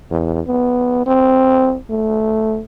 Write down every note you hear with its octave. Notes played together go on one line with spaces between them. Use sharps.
E2
B3
C4
A3